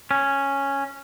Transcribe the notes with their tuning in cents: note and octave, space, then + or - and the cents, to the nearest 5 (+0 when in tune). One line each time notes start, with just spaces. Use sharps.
C#4 -5